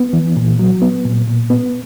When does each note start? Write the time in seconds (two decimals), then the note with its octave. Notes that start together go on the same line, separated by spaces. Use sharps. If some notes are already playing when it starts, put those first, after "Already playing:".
Already playing: B3
0.13 E3
0.37 A#2
0.59 F#3
0.82 B3
1.05 A#2
1.27 A#2
1.50 B3